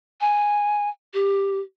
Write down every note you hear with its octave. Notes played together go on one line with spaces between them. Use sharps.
G#5
G4